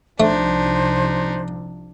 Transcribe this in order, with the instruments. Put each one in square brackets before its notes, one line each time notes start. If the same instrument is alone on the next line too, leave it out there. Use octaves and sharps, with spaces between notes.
[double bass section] C2 C3 F3 [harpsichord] A3 [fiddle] D4 D#4 [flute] C5